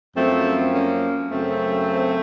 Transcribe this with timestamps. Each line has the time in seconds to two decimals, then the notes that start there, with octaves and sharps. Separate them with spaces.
0.16 F#2 F3 A3 C4
0.73 A#3 C#4
1.31 F#2 C#3 F#3 A3 C4